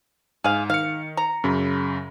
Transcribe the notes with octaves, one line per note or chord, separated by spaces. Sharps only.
G#2 G#4 F5
D#3 F5 C#7
A#5
F#2 C#3 B5